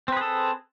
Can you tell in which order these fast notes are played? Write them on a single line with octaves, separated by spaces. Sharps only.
C4 B4 G#4 A4